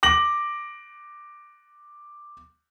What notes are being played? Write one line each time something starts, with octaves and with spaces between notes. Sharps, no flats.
D6 A#6 F#7